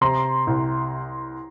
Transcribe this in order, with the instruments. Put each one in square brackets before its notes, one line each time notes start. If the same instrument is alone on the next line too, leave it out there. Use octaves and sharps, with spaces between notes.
[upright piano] C3 [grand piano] A#5 C6
[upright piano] C2